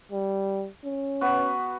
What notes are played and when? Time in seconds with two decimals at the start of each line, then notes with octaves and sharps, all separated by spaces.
0.12 G3
0.84 C#4
1.21 B3 F#4